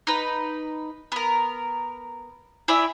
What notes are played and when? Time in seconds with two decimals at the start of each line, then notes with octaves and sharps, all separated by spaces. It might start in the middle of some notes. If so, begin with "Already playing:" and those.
0.07 D#4 B4
1.12 B3 A#4
2.68 E4 G#4 D5 E5